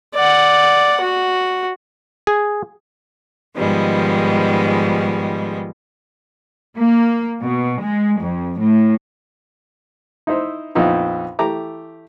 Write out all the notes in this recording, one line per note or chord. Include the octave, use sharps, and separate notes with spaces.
D5 F#5
F#4
G#4
G#2 D#3 F3 G3 G#3 B3
A#3
B2
G#3
F2
A2
D#4 E4 C5 E5
A#1 F2 B3 D#4 E4
E3 A3 G4 A#5 D6